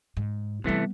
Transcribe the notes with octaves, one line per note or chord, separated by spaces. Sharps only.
G#2
C3 E3 G3 A3 B3